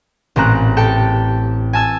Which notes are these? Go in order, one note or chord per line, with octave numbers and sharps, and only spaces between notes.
A1 A#2 C4 A#5 F#6
G4 A4 G5 A5
G#5 A5 E6 G#6